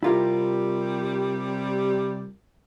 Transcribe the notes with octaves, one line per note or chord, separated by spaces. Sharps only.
C3 G3 E4 F4 A#4